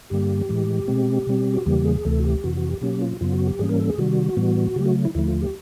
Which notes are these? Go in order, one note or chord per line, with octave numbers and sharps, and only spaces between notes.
G2 D3 G3 A#3 G4
A2 E3 G#3
B2 G#3 C4
B2 G3 C4
F#4
E2 C#3 E3 G3 A#3 G4
G#4
D2 C3 E3 A3 A4
F#4
G4
F2 C3 E3 F#4
F#4
G4
B2 F#3 A#3 C#4 G4
F4
F#2 C#3 F#3 B3 F4
F#4
G4
G#2 E3 G3 A#3 C#4 G#4
A#4
A4
G#4
C3 D#3 G3 F#4
A2 E3 G3 B3
C#3 F#3 A3 G4
F#4
E4
D#2 D3 F3 A3 E4
F4
G4